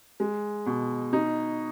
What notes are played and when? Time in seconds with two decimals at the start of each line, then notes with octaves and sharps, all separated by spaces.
0.20 G#3
0.66 B2
1.13 D#4